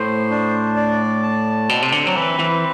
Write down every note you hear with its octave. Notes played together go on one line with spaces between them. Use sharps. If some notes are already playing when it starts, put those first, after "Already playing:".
Already playing: A2 C5
D4
D5
A5
B2 C4
C3
D3
F#3
E3 B4
E3